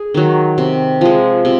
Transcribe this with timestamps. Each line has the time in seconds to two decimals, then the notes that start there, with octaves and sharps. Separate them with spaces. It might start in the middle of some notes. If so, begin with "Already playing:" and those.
Already playing: G#4
0.14 D#3 F#3
0.58 C3
1.01 F3 G#3
1.45 C3